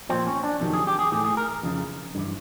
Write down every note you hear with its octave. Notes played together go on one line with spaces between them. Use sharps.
A#2 F3 C4
C#4
D4
F2 C3 D#3 F#3
G#4
G4
G#4
A2 E3 G#4
G#4
A#4
F2 C#3 E3
G2 E3